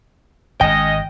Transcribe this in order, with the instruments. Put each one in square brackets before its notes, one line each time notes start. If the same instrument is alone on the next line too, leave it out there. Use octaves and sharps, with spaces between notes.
[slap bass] G#1 G#2 [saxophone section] C#4 D#5 [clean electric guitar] G5